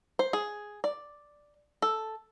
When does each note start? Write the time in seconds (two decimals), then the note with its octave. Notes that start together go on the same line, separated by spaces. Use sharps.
0.19 C5
0.33 G#4
0.84 D5
1.82 A4